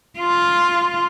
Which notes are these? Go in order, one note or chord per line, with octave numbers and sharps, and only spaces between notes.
F4